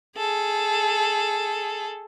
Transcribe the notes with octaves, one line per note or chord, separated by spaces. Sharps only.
G#4 A4